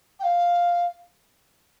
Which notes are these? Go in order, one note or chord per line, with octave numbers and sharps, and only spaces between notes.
G5
F5